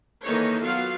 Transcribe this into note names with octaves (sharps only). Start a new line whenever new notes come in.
D#3 E3 A#3 D#4 A4 C#5
F#3 B3 F4 F5